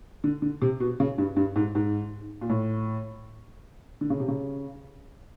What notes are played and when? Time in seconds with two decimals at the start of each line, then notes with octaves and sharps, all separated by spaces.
0.24 D3
0.42 D3
0.62 C3
0.80 B2
1.00 C#3
1.18 G2
1.36 G2
1.56 G#2
1.75 G#2
2.41 A#2
2.50 A2
4.01 D3
4.10 C#3
4.20 C3
4.28 C#3